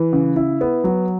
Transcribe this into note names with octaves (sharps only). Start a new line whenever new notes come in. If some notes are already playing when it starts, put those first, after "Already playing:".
Already playing: E3
C#3
E4
B3
F#3